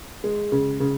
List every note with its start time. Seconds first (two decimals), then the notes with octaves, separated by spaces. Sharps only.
0.24 G#3
0.52 C#3
0.80 C#3